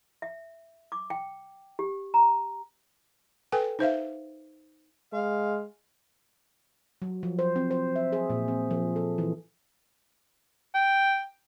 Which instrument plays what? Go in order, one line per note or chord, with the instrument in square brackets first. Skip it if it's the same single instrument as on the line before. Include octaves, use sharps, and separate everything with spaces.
[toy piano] E5
D6
G5
G4
A#5
[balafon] A4 B4 G5 G#5
D#4 C5 E5 F5
[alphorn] G#3 [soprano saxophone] F5
[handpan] F#3
F3
C5
C4
C5
E5
G#4
A#2
C4
F3
A4
E3
[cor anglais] G5